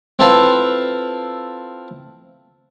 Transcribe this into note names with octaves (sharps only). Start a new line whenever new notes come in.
C4 E4 F4 A4 B4 F5